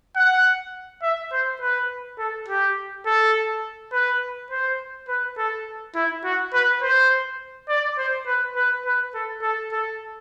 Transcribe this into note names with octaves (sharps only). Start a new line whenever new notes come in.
F#5
E5
C5
B4
A4
G4
A4
B4
C5
B4
A4
E4
F#4
B4
C5
D5
C5
B4
B4
B4
A4
A4
A4